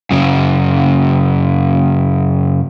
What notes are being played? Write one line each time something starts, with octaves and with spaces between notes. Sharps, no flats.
F#2 C#3